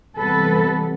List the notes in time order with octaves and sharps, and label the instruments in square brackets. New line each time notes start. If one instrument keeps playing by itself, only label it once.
[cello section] C3 E3 G3 B3 A4 B4